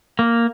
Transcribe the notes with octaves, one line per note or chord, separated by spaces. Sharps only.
A#3